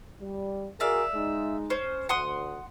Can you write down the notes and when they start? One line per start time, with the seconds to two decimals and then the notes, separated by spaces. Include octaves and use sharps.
0.21 G3
0.80 F#4 G#4 A#4 D5 E5 F5
1.14 G#3 D#4
1.70 C#4 C5
2.09 D2 F#5 C6 D#6